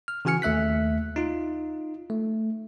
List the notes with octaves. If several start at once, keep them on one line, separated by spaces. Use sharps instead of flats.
F6
C#3 E3 F#4 G#5 F6 C#7
D#2 A3 E5 F#6 B6
D#4 F4
A3